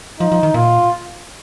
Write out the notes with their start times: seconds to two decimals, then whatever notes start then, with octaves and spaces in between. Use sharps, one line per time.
0.20 F3 D#4
0.32 F3
0.43 D#3
0.54 A#2 F4